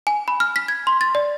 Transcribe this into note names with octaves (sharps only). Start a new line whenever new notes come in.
G#5
B5
F6
B6
G#6
C6
A6
D5